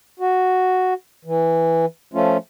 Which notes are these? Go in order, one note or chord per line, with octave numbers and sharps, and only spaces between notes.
F#4
E3
F3 A3 C#4 F4